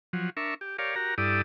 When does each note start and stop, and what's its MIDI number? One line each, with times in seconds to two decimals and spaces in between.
0.13 0.30 53
0.13 0.30 54
0.37 0.54 62
0.37 0.54 70
0.37 0.54 76
0.37 0.54 85
0.61 0.77 67
0.79 0.95 67
0.79 0.95 70
0.79 0.95 73
0.79 0.95 74
0.79 0.95 77
0.95 1.15 66
0.95 1.15 67
0.95 1.15 70
0.95 1.15 82
1.18 1.42 43
1.18 1.42 64
1.18 1.42 67
1.18 1.42 69
1.18 1.42 74
1.18 1.42 87